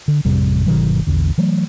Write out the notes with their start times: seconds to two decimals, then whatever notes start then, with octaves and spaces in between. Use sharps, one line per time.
0.08 D3
0.25 A1 F2 C3 G3
0.66 G1 B2 D#3 F#3
1.07 A#1 E2 D3
1.38 E3 F#3 A3